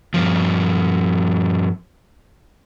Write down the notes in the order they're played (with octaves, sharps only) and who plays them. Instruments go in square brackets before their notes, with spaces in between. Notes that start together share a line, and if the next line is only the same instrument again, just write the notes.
[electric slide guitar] G2 A#2 F3